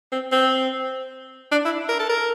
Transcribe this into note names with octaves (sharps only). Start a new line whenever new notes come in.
C4
C4
D4
E4
A#4
A4
A#4